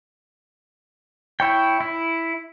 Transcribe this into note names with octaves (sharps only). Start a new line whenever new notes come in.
E4 C#5 G5
E4